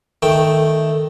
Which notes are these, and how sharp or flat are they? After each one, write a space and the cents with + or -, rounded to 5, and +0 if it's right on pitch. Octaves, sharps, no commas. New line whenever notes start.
D#3 +0 A3 +0 G5 +0